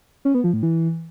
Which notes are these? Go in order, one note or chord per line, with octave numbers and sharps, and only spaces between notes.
C#4
B3
F3
A2
E3